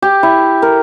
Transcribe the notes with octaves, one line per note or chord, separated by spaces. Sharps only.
G4
E4
A#4